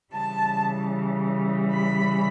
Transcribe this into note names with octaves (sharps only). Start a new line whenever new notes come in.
C#3 E3 G3 A5
B5